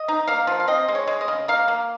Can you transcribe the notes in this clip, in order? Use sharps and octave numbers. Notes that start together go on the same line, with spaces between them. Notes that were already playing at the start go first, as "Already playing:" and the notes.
Already playing: D#5
D#4
A#3 F5
F3
F5
C4 D#5
G#3
C#5
G#3
D#5
C#3
A#3 F5
A#3